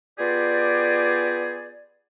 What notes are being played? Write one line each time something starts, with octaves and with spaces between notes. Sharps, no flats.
B3 F4 G4 G#4 D5